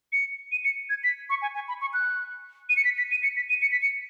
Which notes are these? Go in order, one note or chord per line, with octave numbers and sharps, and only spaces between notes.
C#7
D#7
C#7
G#6
B6
C#6
G#5
G#5
B5
C#6
F#6
D#7
C#7
B6
B6
D#7
C#7
B6
D#7
C#7
B6
C#7